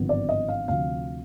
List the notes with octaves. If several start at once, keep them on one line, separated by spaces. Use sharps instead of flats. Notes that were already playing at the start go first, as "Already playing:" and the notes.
Already playing: G#1 G2 D3 F3 B3
D5
D#5
F5
D2 C3 F3 F5